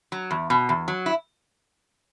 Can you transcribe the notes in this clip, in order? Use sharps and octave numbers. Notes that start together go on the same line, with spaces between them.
F#3
E2
B2
E2
F#3
E4